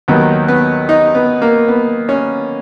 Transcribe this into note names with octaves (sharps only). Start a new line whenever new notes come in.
D#2 D#3 F#3 B3
B3
D#4
B3
A#3
B3
C#4